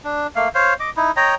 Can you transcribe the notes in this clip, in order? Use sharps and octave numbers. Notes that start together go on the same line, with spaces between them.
D4
A3 A#3 F5
C5 C#5 F5
D#5 D6
D#4 E4
C#5 D#5 G5 A#5